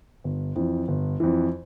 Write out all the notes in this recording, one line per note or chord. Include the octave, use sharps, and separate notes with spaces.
G1
F2 E3
G1
F2 E3